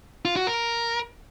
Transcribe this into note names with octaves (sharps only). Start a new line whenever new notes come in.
F4
F#4
A#4